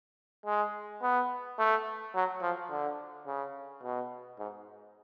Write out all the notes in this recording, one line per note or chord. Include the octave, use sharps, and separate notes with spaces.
G#3
B3
A3
F#3
F3
D3
C#3
B2
G#2